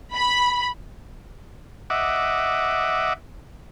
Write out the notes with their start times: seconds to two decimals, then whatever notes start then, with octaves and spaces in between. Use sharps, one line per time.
0.14 B5
1.90 D#5 E5 F#5 D6